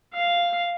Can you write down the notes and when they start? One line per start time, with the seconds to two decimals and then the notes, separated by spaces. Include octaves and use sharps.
0.14 F5